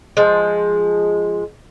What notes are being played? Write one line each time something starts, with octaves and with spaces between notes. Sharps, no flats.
F3 G#3